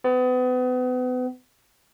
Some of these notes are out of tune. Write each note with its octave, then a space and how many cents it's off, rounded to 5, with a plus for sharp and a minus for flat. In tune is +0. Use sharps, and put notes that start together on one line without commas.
B3 +35